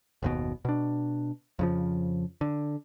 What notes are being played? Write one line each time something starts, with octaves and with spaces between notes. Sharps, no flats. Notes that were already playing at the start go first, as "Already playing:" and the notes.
F#1 D#2 B2
B2 D4
F2 C#3 F3
D3